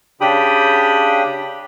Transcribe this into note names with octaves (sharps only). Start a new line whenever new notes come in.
C#3 D4 G4 G5 B5 D#6